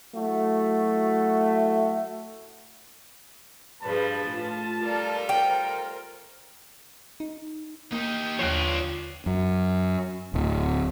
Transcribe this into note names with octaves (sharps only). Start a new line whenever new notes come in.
F#3 A3 E4 F#4
G2 F3 G#4 B4 A5
A2 F4
G3 F4 A4 A#4 D5
A#4 C5 G5
D#4
A#3 D#4 G4
D#2 F3 D4 F4 C5 C#5
F#2
D1